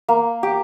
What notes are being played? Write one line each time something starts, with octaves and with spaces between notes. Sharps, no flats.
A#3
G4